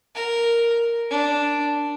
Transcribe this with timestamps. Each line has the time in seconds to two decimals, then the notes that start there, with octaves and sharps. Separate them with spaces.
0.15 A#4
1.10 D4